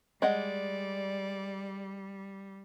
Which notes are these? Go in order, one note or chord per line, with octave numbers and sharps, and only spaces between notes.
G3 G#3 D5 D#5 F#5